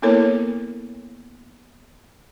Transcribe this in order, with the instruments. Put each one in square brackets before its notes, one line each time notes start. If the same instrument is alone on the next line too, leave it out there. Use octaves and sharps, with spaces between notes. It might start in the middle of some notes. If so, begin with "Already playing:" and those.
[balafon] A#3 B3 E4 A4 A#4 C#5